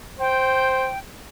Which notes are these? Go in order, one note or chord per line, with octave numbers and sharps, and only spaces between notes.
C5 G5